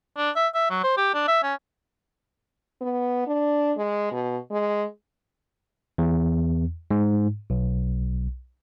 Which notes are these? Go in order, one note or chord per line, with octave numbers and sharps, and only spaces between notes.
D4
E5
E5
F#3
C5
G4
D4
E5
C#4
B3
D4
G#3
B2
G#3
E2
G#2
B1